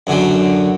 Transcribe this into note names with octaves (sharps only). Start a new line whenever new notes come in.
F#2 D3 F#3